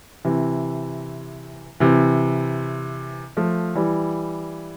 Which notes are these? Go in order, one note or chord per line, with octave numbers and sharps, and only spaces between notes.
C3 E3
C3 E3
F3 A3
E3 G3